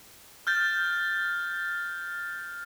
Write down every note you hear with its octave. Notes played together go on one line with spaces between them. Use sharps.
F6 G6 A6